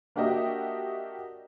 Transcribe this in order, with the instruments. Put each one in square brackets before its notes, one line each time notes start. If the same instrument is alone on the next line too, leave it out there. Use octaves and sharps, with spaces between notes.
[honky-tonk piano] A#3 D4 F#4 G4 D#5 E5